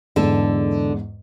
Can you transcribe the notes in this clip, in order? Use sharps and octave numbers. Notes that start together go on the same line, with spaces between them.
E2 G#2 D3 A4